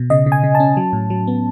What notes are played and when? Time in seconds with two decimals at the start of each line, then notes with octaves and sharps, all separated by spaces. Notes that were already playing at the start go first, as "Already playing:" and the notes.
Already playing: B2
0.10 C#3 D#5
0.26 C#3
0.32 G#5
0.43 C#3
0.55 A5
0.60 C#4
0.77 F#3
0.93 A2
1.10 F#3
1.27 B3